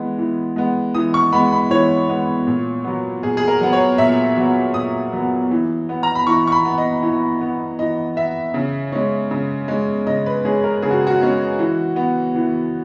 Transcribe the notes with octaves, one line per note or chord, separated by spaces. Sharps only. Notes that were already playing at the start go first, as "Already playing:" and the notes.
Already playing: E3 G#3 B3
E3
G#3 B3
E3 D#6
C#6
G#3 B3 B5
B5
E3 C#5
G#3 B3
A#2
F#3 B3
A#2 G#4
G#4
A#4
F#3 B3
C#5
A#2 E5
F#3 B3
A#2 D#6
F#3 B3
E3
B3
A#5
B5
E3 C#6
C#6
B5
B3
D#5
E3
B3
E3 D#5
B3 E5
C#3
G#3 C#4
C#3
G#3 C#4
C#3 D#5
B4
G#3 C#4 G#4
A#4
C#3 G#4
F#4
F#4
G#3 C#4
E3
B3
E3